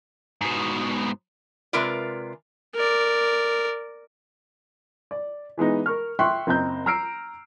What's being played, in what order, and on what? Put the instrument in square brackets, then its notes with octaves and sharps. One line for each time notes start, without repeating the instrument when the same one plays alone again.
[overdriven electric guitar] G#2 B2
[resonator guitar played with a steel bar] C3 G#3 F4 A#4 B4 D5
[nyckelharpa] A#4 D5
[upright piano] D5
E3 G#3 B3 D#4
A#4 C#6 F6
E5 G5 C6 C#6 F#6
F#1 C4 D#5 A#5 G6
A#5 E6 F6 C7 D7